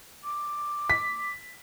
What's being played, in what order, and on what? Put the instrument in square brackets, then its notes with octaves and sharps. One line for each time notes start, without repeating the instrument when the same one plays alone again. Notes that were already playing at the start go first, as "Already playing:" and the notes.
[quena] D6
[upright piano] B6